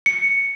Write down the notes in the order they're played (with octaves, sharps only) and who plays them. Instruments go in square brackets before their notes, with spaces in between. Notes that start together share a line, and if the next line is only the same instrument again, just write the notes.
[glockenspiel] C#7